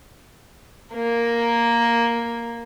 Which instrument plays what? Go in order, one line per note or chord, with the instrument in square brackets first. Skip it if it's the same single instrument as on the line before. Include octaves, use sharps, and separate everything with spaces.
[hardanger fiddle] A#3 A#4